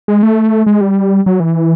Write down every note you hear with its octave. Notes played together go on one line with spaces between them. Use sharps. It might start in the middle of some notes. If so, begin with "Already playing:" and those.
G#3
A3
G#3
G3
F#3
E3